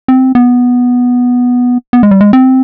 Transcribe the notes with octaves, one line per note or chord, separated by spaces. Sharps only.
C4
B3
B3
G#3
G3
G#3
C4